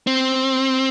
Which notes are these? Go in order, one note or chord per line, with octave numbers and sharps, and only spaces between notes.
C4